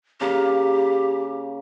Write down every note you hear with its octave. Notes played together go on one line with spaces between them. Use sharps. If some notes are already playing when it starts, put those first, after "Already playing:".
C#3 A#3 G4 A#4